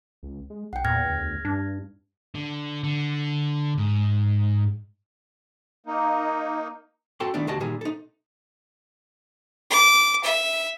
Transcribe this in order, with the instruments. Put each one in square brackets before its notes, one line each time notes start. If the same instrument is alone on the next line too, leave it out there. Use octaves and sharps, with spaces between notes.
[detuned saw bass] C#2
G#3
[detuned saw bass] B1 [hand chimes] F#5 G5
[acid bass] E2 [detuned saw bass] A#2 [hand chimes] F6 G#6 A#6
[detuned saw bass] D2
[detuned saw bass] G2 [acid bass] D4
[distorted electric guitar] D3
D3
G#2
[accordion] A#3 D#4
[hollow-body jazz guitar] C4 F#4 A4 G5 A5 C6
D#3 E3 A3 B3 D4
D2 F#4 G4 D#5 A5
A#2 D#3 G3 G#4
D#4 A4
[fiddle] D6
E5